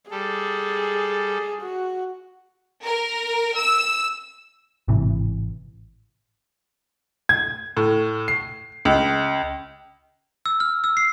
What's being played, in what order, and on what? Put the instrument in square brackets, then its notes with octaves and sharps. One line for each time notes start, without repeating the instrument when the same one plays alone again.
[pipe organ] G3 A4 [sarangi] G#4
[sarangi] F#4
[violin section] A#4
E6
[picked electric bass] G#1 A2 C3 E3
[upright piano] G#6
A2
C7
C#2
[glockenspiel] E6
F6
E6
C7